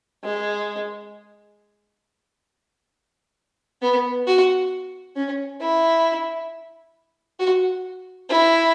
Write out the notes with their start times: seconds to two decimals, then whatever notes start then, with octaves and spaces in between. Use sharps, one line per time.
0.24 G#3
3.82 B3
4.27 F#4
5.16 C#4
5.61 E4
7.40 F#4
8.29 E4